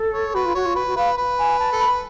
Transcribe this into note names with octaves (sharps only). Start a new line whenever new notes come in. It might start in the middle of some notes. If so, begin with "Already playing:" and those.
Already playing: A4
C#5
F#4 B4
F4
F#4 C#5
F4
F#4 B4
F#4
B4 F5
B4
G#5
A5
A4
B5
B4